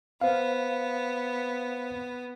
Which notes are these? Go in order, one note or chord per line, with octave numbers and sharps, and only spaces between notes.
B3 C5 F5